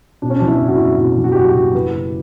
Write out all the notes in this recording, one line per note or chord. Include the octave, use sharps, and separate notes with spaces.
B2 D4
C#4
E2 D4
E4
F#1
F#4
E4
F#1
B2 E4
E2
F#4
G4
F#1 F#4
G4
F#1
E3 B4
C#3